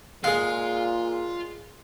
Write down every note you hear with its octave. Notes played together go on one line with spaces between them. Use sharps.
A#2 G#3 F4 G#4 F5